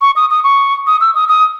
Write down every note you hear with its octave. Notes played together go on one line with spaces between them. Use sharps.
C#6
D#6
D#6
C#6
D#6
E6
D#6
D#6